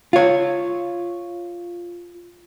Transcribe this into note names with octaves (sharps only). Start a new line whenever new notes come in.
F4 C#5